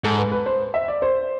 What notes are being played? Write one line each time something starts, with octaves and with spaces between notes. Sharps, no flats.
G#2 A4
B4
B4
C5
E5
D5
C5